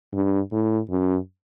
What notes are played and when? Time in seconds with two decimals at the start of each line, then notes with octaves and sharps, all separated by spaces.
0.14 G2
0.52 A2
0.90 F#2